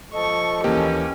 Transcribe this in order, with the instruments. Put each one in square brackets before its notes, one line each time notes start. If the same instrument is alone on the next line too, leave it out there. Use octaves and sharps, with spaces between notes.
[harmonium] F3 A4 D#5 [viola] C#6
[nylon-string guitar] D#2 E3 [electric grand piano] A#3 G4 [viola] C#4